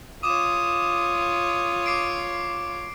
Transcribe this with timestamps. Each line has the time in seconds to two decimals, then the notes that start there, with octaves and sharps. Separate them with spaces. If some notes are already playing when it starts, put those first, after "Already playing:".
0.23 F4 C#5 D6 D#6 E7
1.86 D6 C7 D7